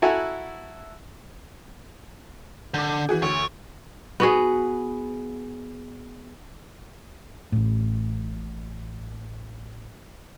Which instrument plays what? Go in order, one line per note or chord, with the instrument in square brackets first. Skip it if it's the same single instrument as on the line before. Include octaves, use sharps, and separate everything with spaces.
[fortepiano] E4 F#4 A4 F#5 G#5 A#5
[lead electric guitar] D3 [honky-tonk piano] D6 G6
[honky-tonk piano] E3 F#4 G#4
[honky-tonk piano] D2 [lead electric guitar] C#5
[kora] B3 F#4 G#4
[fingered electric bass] A1 A2